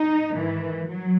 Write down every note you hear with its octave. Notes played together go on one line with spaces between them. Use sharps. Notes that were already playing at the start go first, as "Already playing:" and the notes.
Already playing: D#4
G#2 D#3 E3
F#3